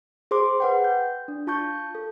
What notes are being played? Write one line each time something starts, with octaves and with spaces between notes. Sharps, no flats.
G#4 C5 C6 D6
B4 F#5 G5
G6
D4
F4 A5 C#6 G6
A4